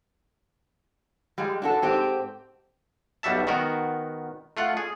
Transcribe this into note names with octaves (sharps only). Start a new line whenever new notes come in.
G3 G#3
D4 F#4 A4
G#2 C4 G4
B1 G3 F#4 E5 A5
D#3 B3 F#4 A#4
A3 F4 F#5
G#4